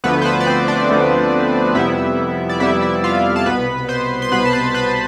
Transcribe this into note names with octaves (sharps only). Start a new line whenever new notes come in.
D2 D3 F3 A3 B3 B4
C5
B3 B4
D5
C4 C5
D4 D5
D2 D3 F3 A3
F2 C3 G3 B3 E4 E5
D5
F2 C3 G3 B3 E4 E5
E4 E5
F4 F5
A5
C2 B2 B3 B4 B5
C5 C6
C6
C2 B2 B3 B4 B5
A5
B4 B5
B4 B5